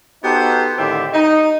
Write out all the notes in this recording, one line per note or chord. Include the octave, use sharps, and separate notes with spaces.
B3 D#4 F#4 G4 A4 C5
A2 D3 D#3 C4 G4 E5
D#4